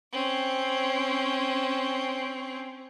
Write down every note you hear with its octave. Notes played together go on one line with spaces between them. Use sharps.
C4 C#4